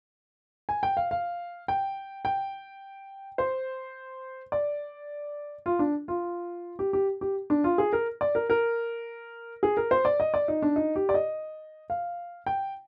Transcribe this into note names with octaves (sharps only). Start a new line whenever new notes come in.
G#5
G5
F5
F5
G5
G5
C5
D5
F4
D4
F4
G4
G4
G4
D4
F4
G#4
A#4
D5
A#4
A#4
G#4
A#4
C5
D5
D#5
D5
D#4
D4
D#4
G4
D5
D#5
F5
G5